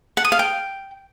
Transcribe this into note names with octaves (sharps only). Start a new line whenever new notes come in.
F#5
D#6
F5
G5